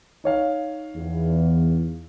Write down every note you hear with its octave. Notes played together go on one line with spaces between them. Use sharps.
D#4 C#5 F5
E2